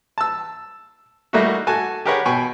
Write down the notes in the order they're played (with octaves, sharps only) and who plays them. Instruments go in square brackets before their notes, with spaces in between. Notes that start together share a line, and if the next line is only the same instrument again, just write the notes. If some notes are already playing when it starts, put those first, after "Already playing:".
[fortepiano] A5 E6
G3 A3 A#3 D#4 E4 F#4
F#4 A4 G#5 A5
G4 G#4 A#4 B4 C#5 F#5
B2 G5 G#5 B5 C#6